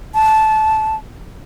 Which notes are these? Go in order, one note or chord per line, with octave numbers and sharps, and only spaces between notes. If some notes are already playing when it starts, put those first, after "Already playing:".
A5